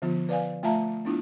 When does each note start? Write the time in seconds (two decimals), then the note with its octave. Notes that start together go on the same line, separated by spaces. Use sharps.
0.02 D3 F3 B3 F4
0.29 B4 D5 F5 G#5
0.63 A3 F4 E5 F5 A5 A#5
1.05 B3 D4 E4 F4